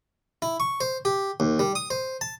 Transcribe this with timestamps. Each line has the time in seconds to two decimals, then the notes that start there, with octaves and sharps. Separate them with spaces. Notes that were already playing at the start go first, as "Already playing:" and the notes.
0.42 E4
0.60 C#6
0.81 C5
1.05 G4
1.40 D#2
1.59 G3
1.75 D#6
1.90 C5
2.21 A5